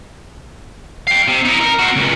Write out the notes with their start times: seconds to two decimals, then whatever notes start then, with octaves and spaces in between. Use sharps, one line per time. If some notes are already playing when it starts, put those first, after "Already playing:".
1.07 F5 G5
1.28 C3
1.45 D#4 E4
1.61 A#4
1.79 C4 F#4
1.96 C#2 A#2